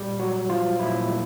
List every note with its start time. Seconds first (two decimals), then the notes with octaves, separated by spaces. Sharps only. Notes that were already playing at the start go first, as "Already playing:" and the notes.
Already playing: A#2 G3 G4
0.19 F#3 F#4
0.50 F3 F#3 F4
0.79 A#2 E4
1.10 A#2